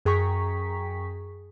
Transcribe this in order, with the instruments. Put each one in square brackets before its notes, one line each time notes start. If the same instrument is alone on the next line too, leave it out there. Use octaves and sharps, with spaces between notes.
[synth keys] F#2 G#4 G5 A#5 C#6 B6